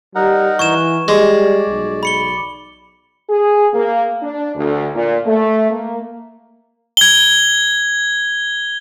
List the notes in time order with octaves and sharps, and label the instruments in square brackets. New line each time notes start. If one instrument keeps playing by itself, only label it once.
[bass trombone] G3 [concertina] D#4 A#4 F#5
[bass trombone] E3 [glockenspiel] C#6 G#6 E7
[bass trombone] G3 [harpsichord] G#3 [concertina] D5
[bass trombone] B1
[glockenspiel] B5 C#7 G7
[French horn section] G#4
A#3
D4
D2
A#2
A3
A#3
[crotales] G#6 G7